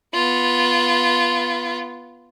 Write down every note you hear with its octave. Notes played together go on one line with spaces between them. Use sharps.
B3 F4